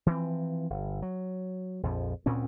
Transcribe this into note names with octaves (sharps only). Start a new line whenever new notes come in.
E3 F3 G#3 C4
G1
F#3
A#1 F2 F3
D2 A#2 C4 C#4